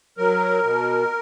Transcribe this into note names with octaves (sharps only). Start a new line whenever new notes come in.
F#3 A#4
B2